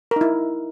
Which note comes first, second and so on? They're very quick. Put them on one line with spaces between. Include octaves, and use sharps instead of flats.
A#4 D#4 E4